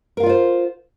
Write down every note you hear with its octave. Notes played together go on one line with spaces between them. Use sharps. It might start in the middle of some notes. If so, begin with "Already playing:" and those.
F4 A#4 C5 D5 F5